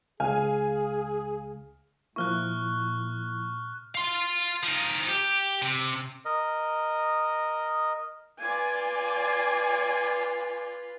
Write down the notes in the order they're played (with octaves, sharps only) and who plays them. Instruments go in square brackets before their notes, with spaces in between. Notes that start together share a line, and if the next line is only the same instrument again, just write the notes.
[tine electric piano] C#2 [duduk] G#4 [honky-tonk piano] F5 G#5 F6
[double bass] A#2 [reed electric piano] F3 A#3 E4 [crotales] C#6 F6 F#6
[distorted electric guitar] F5 C6
F3 D#4
G4
C3
[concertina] A#4 D#5
[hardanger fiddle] F4 B4 [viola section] D5 G#5